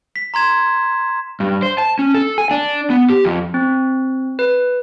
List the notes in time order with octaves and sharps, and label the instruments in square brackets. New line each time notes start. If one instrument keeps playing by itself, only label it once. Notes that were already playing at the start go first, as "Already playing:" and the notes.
[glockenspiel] B6
A#5 C6 G#6 E7
[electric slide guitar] G2
C5
A5
C#4
A4
G#5
D4
B3
G4
F2
[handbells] C4
B4